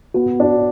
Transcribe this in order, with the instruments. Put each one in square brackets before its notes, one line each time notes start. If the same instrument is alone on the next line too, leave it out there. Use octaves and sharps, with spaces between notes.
[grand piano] B3 [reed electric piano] F#4
[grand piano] D4